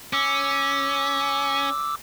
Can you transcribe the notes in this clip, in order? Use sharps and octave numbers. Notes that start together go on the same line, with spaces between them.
C#4 D6 E6